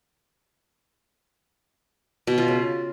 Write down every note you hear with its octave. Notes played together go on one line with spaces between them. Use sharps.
B2
F4
C#3